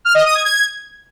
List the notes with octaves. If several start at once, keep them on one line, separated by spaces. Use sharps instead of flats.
F6
D#5
D#6
G#6
G#6